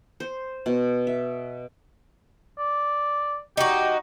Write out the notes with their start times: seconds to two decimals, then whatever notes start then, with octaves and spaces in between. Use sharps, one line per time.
0.20 C5
0.66 B2
1.07 E5
2.58 D5
3.57 D#4 F#4 G4